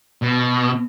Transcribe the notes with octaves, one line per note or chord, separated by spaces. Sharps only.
B2